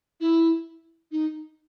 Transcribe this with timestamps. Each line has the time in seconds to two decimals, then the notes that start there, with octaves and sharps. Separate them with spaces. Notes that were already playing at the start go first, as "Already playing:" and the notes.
0.21 E4
1.11 D#4